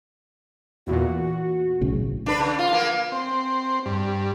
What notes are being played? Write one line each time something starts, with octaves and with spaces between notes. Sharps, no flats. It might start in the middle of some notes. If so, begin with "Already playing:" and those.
E2 A#2 F#4
B1 A2 C#3
D4 B4
C#3
F4
A#3 B3
C4
G2